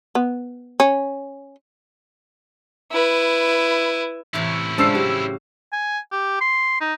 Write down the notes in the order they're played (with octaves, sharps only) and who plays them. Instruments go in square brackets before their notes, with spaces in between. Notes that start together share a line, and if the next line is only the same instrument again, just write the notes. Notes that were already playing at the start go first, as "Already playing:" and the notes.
[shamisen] B3
C#4
[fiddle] E4 B4
[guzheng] A2 C3 E3 [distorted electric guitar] C#4 E4
[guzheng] C#3 F4 A5 [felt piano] G#3 D4 [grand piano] C5 E6 C7
[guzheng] F#3 [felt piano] G4
[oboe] G#5
G4
C6
D#4